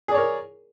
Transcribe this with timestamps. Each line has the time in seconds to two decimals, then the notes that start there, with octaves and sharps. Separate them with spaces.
0.08 G#4
0.11 D5
0.14 C#5
0.17 A#4